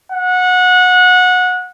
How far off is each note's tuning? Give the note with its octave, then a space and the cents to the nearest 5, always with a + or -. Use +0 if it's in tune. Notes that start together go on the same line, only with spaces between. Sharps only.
F#5 -25